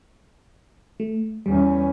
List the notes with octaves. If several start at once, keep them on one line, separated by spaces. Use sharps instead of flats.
A3
E2 G3 C#4